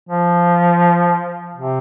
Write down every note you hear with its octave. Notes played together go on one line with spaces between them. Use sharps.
F3
C3